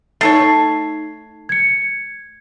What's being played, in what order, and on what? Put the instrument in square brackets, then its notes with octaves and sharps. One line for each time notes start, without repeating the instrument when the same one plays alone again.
[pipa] A3 A4 C#5 [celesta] D#4 C7
[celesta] G#6 C#7